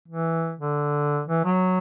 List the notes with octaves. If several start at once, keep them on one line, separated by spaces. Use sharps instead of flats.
E3
D3
E3
F#3